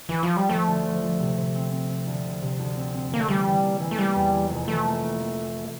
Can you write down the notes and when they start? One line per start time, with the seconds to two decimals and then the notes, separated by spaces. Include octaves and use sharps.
0.09 E3
0.23 F3
0.37 G3
0.49 F3 A3
0.67 D2
0.85 F3
1.02 F3
1.19 C3
1.37 C3
1.55 C4
1.71 C4
1.89 C4
2.07 D2
2.24 C3
2.41 C3
2.59 D2
2.76 C4
2.94 C4
3.11 D2 A#3
3.20 A3
3.28 E3 G3
3.46 E3
3.63 A#3
3.80 E3
3.91 A3
3.98 G3 A#3
4.15 E2
4.33 E3
4.50 F1
4.68 E3 A3
4.85 A#3
5.02 A#3
5.19 A#3